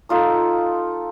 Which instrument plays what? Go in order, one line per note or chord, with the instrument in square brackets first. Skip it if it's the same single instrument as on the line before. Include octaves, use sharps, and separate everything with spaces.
[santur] A3 D#4 F4 D#6